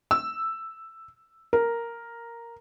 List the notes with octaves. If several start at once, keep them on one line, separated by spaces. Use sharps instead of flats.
E6
A#4